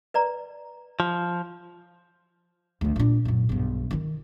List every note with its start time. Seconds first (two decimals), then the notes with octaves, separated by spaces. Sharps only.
0.14 B4 D5 A#5
1.00 F3
2.81 D2 D#3
2.96 A#2 D4
3.25 F#2 A#2
3.49 B1 G2
3.91 D#3 E4